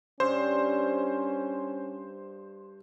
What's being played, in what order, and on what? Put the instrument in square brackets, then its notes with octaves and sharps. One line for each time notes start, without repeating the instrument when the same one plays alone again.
[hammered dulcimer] G2 [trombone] C#4 [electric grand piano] C5